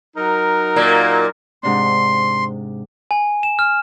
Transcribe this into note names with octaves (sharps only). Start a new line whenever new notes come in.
F#3 D#4 A#4
A#2 A#3
G#2 C3 D4 C6
G#5
E7
F6